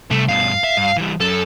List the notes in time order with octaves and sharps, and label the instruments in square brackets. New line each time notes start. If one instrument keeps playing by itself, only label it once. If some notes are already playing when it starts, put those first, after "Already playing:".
[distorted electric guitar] C3 G3 [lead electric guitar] A3
[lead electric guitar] G2 B2 [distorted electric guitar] F5
[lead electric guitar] E5
G2
E3 G3
[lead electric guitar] F#2 [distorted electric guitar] A4